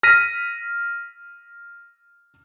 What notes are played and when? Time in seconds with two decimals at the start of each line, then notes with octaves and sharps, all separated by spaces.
0.03 F6 A#6 B6 D#7